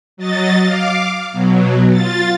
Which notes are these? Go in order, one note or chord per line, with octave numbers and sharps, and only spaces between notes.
F#3 D#5 A6
F5 D6
B2 F#3
F4 A6